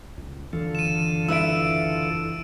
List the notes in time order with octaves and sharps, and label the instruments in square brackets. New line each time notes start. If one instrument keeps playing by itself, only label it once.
[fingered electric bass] C#2
[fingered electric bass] F#1 C#2 E3 [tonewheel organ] D3 F4 A4
[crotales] D#7 E7
[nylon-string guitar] E4 B4 E5 [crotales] E6 D7